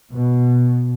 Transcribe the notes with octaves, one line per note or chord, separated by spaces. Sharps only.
B2